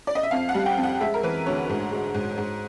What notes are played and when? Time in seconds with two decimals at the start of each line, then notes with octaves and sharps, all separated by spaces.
0.07 D5
0.15 D#5
0.23 E5
0.31 F2 F5
0.49 F#5
0.55 G3
0.66 G5
0.77 F2
0.83 F#5
1.01 G#3 E5
1.14 A#4
1.23 E3 B4
1.46 D2 C#5
1.69 G#2
1.92 G#3
2.15 G#2
2.38 G#2